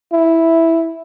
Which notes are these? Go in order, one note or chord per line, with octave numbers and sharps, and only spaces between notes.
E4